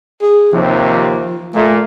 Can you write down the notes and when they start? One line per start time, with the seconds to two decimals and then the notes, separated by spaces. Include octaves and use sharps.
0.21 G#4
0.53 D#2 C3 F3
1.54 A#2 A3